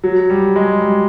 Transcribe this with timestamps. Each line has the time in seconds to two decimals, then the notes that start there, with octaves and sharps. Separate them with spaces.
0.04 F#3
0.30 G3
0.56 G#3
0.81 G3